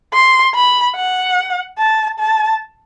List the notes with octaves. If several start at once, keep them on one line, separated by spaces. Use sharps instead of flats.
C6
B5
F#5
A5
A5